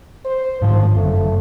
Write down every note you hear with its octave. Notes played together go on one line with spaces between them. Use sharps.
C5
G#2 D3 D#3 F3
G1 F#2 A3